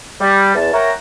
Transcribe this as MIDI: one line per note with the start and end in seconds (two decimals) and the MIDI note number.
0.21 0.52 55
0.55 0.70 40
0.55 0.70 81
0.74 0.91 70
0.74 0.91 73
0.74 0.91 76
0.74 0.91 78
0.74 0.91 79
0.74 0.91 82